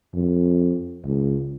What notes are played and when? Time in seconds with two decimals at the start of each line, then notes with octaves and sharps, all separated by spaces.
0.14 F2
1.05 C#2